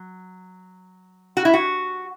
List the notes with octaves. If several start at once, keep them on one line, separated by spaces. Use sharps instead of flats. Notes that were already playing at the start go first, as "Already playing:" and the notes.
Already playing: F#3
F#4
E4
F#4